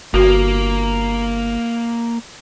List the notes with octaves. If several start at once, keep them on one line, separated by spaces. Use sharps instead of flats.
G1 A#3 F#4